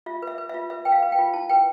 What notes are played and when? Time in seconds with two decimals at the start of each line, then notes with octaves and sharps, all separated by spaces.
0.06 F4 E5
0.22 B4
0.27 E5
0.38 B4
0.49 E5
0.54 F4
0.70 B4 E5
0.85 B4 G5
0.92 F5
1.02 B4
1.12 G5
1.18 F4
1.34 E4 A5
1.49 B4 G5